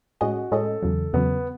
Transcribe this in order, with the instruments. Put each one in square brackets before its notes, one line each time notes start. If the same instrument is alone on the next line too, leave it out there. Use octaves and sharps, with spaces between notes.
[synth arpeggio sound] A2 G#3 C#4 G#4 D#5 [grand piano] F#4
[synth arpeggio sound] A2 G#3 C#4 G#4 D#5 [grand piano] A4
[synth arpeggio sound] E2 C#3 F#3
[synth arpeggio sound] E2 C#3 F#3 [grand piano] B3